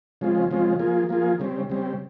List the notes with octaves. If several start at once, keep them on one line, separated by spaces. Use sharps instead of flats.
C#3 F3 G#3 C4 F4
C#3 F3 G#3 C4 F4
F3 A#3 F4 G#4
F3 A#3 F4 G#4
C#3 G3 C4
C#3 G3 C4